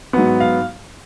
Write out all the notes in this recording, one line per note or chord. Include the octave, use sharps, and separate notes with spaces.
G#2 F#3 B3 F#5
F5